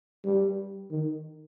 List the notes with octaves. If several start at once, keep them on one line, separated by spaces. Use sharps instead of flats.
G3
D#3